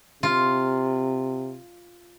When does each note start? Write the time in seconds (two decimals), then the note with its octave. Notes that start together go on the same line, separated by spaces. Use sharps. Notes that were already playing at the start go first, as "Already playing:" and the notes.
0.23 C3 F4